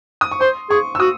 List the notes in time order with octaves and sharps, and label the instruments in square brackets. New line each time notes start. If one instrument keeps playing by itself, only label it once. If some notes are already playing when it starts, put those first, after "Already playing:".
[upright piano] D#6
C#6
[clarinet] C5 [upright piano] C6
[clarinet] G#4 [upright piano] C#6
[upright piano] E6
[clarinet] F#4 [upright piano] D#6